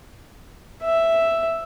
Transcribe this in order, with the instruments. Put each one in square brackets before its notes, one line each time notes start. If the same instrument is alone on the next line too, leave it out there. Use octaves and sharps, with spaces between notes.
[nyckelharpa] E5